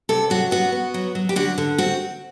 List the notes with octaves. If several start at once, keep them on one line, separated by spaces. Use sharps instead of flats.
C3 A4
F#3 F#4
B3 F#4
B3
F#3
F#3
G4
D3 F#4
D3
C4 F#4